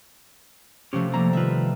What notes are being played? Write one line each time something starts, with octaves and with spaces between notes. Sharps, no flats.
C3 F3 A3 C#4 G4
F3 G3 A#3 A#5
D#3 F4 B4 E5